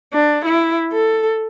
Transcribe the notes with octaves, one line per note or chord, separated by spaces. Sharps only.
D4
E4
A4